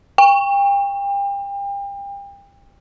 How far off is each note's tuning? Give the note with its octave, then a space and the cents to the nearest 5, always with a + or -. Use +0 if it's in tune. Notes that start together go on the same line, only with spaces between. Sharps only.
G5 +35